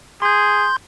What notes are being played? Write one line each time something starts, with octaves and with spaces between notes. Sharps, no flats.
G#4 C6 G6